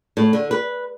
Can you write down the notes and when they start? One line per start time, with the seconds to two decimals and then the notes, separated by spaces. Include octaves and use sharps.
0.17 A2
0.33 D3
0.51 B4